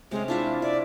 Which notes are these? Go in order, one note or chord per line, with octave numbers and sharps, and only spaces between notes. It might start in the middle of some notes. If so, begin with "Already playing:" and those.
C3 G#3 C#4
D4 E4 F4 E5
D5 E5